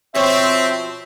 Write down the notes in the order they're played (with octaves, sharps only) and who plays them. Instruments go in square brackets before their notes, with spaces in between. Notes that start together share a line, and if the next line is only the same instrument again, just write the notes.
[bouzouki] B2 F3 C#5 [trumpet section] C4 [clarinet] E5